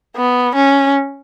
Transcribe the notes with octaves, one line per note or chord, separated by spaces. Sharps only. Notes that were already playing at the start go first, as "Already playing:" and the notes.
B3
C#4